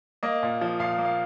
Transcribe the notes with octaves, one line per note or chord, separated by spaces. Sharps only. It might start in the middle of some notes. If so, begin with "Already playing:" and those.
A#3 D#5
A#2
F3
A#2 F5
A#3
F5